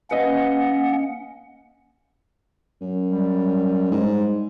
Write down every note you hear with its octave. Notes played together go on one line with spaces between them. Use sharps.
A#3 C#4 B4 D#5 F#5
F#2
G3
G#2